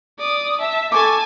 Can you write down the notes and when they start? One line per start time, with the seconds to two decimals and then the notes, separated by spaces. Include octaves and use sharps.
0.18 D5 D#6
0.61 E5 A5
0.92 A4 G#5 A5 C#6 D6